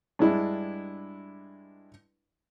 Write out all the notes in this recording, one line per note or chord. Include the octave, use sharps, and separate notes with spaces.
G2 G#3 D4 E4